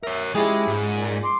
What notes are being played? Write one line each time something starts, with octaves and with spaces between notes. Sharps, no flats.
A#4 C#5 E5
G#3 C#4 E4 F4 G4 G#4
G#2
A#2
C6 D6